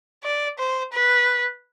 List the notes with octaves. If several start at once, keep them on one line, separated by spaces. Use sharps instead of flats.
D5
C5
B4